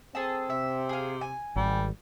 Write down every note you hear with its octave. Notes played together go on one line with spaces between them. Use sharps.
C4 G#4 A4 A5
C3 E5
G#4 F5
G#5
G#1 G3